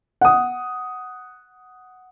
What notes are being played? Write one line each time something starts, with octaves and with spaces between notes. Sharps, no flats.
F#5 D#6